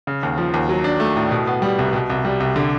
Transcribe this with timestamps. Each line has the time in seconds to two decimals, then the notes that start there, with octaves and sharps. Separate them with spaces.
0.07 C#3
0.23 D#2
0.38 F3
0.54 D#2
0.69 F#3
0.84 D4
1.00 A3
1.16 A2
1.31 B2
1.47 B3
1.62 G3
1.79 C2
1.93 B2
2.10 C2
2.25 G3
2.40 C2
2.56 D3